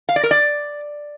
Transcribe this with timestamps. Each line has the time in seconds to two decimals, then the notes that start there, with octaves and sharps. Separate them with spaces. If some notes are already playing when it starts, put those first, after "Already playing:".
0.09 F5
0.16 D5
0.23 A#4
0.31 D5